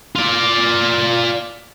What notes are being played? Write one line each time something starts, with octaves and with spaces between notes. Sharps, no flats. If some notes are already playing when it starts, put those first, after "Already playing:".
F4 D5